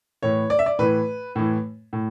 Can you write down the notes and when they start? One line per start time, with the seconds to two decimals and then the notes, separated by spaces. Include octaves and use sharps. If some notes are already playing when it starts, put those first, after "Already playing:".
0.23 A2 E3 C#5
0.50 D5
0.59 E5
0.66 D5
0.79 A2 E3 B4
1.35 A2 E3
1.93 A2